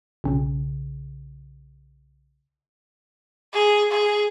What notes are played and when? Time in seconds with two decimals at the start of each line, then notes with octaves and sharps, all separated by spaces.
0.24 B1 C#3
3.54 G#4
3.91 G#4